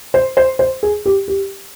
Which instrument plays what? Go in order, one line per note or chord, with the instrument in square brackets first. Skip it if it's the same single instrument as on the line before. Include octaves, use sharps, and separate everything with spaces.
[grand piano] C5
C5
C5
G#4
G4
G4